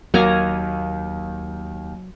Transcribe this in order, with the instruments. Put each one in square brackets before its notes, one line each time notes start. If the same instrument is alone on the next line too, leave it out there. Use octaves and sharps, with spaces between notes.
[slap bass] D#2 [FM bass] F#3 [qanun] A#3 G#5 A#5